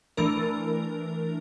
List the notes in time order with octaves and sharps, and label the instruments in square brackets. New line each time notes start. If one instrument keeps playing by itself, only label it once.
[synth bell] E3 A3 D4 A#4